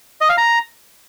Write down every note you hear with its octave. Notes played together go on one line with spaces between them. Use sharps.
D#5
F5
A#5